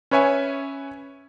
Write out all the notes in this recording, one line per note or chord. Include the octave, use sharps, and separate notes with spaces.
C#4 B4 C#5 E5 G#5